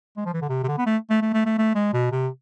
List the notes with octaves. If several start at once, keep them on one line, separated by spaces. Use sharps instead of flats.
G#3
F3
E3
D3
C3
C3
D3
B3
A3
A3
A3
A3
A3
A3
G#3
B2
C3